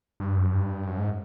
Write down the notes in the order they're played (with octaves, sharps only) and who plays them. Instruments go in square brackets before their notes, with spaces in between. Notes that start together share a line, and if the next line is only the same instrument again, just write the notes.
[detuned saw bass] G2
F#2
G2
F#2
G#2